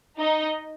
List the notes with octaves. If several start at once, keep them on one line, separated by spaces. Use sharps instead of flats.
D#4 D#5